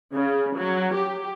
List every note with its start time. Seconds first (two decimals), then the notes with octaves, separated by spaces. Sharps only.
0.14 C#3
0.57 F#3
0.96 G4